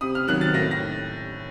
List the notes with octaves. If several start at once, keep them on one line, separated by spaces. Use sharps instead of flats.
C3 D#6
F6
D#3 F#3 A#3 F#6
A6
A2 A#6
A#6